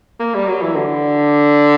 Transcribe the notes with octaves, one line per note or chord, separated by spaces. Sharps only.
A#3
G3
F#3
E3
D3